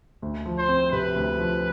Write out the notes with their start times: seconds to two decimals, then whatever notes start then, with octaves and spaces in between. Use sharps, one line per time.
0.22 D2
0.46 F3
0.58 C5
0.68 C4
0.92 C3 B4
1.16 D2
1.38 F3